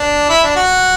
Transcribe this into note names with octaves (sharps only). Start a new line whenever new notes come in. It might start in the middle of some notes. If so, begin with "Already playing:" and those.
Already playing: D4
E4
D4
F#4